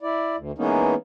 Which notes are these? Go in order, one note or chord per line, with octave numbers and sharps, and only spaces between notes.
E4 D5
D2
E3 G#3 A#3 B3 C#4 D#4